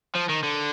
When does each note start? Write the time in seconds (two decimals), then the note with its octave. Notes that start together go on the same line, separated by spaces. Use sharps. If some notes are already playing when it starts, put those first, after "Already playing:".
0.15 F3
0.29 D#3
0.44 D3